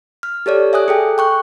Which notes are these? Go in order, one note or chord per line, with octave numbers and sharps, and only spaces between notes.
F6
G4 A4 C#5 D5
E5 G#5 D#6 F#6
G#4 A4 G5
G5 C#6 F#6